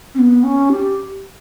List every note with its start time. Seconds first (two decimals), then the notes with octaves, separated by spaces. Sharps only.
0.15 C#4
0.19 B3
0.43 C#4
0.71 G4